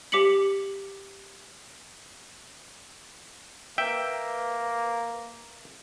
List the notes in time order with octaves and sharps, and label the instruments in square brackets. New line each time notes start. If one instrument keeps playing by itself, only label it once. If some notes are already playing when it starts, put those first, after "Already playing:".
[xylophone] G4 D6 B6 C#7 F#7
[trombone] A#3 [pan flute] B4 [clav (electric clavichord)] E5 G5